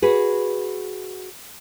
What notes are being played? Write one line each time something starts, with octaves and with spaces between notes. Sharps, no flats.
F#4 G#4 B4